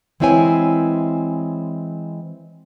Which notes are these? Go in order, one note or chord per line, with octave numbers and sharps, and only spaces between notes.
E3 G#3 C4 E4 C#5 G#5